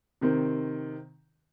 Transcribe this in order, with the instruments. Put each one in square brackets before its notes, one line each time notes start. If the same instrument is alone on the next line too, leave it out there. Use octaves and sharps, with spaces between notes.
[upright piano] C3 D#3 C4